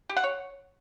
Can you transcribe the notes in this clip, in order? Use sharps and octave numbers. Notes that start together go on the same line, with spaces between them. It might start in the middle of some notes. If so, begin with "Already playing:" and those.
G4
F#5
C#5